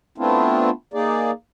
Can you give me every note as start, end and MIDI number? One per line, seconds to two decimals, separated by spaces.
0.18 0.70 57
0.18 0.70 59
0.18 0.70 60
0.18 0.70 62
0.18 0.70 64
0.18 0.70 65
0.94 1.31 58
0.94 1.31 63
0.94 1.31 68
0.94 1.31 74